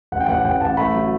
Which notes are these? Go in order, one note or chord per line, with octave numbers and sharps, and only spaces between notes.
A1 F#5
G5
A1 F#5
A1 G5
A1 A5
A3 B5
F#3